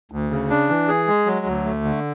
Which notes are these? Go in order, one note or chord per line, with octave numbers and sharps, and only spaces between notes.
D2
C#3
D4
E3
G#4
G#3
F#3
D2
A3
D3